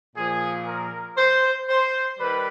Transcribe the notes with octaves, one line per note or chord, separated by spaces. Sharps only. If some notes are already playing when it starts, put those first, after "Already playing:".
A#2 F3 G#4
A#4
C5
C5
D#3 G3 B4